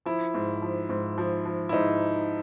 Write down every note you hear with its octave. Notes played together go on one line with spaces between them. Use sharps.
F3 E4
G#2
F3
G#2
F3
F3
E4
G#2 D#4